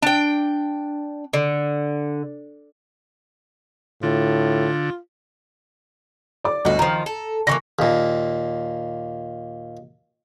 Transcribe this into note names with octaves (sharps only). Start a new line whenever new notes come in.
D4 G5
D3
A2 D3 F4
D5 D6
G1 D2 D#4 F#4
D#3 F3 A#5
A4
D3 E3 A#3 C#6 A#6
D#2 A#2